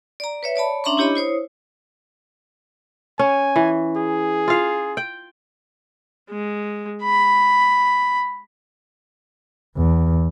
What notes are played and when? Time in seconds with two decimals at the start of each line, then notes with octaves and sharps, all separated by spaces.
0.20 D5 A#5
0.43 B4 C#5 E5
0.56 C#5 D5 A5 B5
0.84 C#4 D4 E5 A#5 C6 C#6
0.97 D4 E4 G4 C#5 D#5 B5
1.15 E4 C5 C#5 D#6
3.19 C#4 G#5
3.56 E3
3.97 G#4
4.48 F4 F5
4.97 G5
6.30 G#3
7.03 B5
9.77 E2